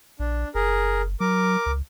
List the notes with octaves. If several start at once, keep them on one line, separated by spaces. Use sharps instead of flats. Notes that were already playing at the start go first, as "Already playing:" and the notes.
A#1 D4
F#1 G#4 A#4
F#3 A#4 D6
C#2